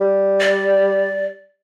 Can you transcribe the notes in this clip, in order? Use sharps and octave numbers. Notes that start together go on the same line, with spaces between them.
G3
D5